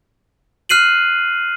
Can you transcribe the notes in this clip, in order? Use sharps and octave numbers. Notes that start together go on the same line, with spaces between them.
F6 F#6 C7 D#7 F#7